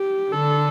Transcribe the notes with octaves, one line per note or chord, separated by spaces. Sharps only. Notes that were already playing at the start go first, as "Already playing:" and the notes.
Already playing: G4
D3 A4